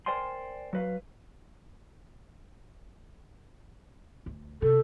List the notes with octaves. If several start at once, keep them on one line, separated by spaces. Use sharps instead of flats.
A#4 C5 D5 G5 G#5 C6
F#3 F#4 B4 F5
D2
C3 A4